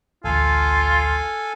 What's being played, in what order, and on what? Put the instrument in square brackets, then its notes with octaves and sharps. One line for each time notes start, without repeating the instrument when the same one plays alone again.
[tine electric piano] A1 D2 [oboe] F4 [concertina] A4 F5 G#5